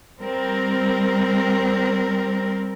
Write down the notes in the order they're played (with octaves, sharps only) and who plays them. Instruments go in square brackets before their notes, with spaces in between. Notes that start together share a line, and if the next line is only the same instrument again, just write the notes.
[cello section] G3 C4 A#4